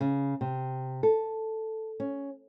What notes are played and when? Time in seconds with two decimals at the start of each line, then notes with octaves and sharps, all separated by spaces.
0.01 C#3
0.41 C3
1.03 A4
2.00 C#4